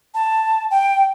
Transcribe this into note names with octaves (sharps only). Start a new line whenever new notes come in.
A5
G5